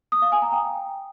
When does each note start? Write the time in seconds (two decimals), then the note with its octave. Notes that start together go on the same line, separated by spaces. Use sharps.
0.12 D#6
0.22 F5
0.32 G#5
0.42 A#5
0.52 G5